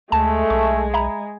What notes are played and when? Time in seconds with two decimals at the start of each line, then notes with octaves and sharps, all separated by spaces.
0.12 D2 G#3 A3 A5
0.50 B1 C#6
0.94 E5 A#5 B5